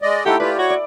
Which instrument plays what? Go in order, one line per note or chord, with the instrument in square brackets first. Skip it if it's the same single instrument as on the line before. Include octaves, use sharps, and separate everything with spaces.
[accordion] G#3 D5 D#5
[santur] A3 E4 [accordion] D#4 A4 F#5 [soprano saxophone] G4
[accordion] F4 G4 [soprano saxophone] B4 [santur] D5 G#5
[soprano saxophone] F#4 [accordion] C#5 C#6
[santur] D5